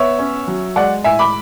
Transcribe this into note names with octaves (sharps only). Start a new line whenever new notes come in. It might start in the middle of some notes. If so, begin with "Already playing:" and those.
Already playing: B3 C#5 E5
C#4
F#3
G#3 D5 F#5
A2 E5 G#5
B5 D6